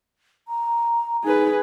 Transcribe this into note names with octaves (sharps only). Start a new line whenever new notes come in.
A#5
D#4 G#4 B4